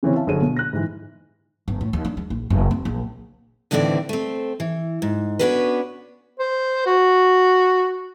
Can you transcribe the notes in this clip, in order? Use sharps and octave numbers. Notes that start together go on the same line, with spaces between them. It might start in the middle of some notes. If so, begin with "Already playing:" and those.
C#3 E3 C4 C#4
E5 F5 A5
G1 F#3 G#4 C5 C#5 D#7
B2
F#6 A#6
G#2 E3
G1
A2
D#2
D4
G#3
A#1
F#1
C4
A#1
D#2 A2 D3 E3 C4 D5
A3 C4
E3
G#2
B3 C#4 D4 F#4 A#4 B4
C5
F#4